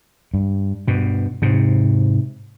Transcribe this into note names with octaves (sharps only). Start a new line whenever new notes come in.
G2
G2 B2
G#2 C3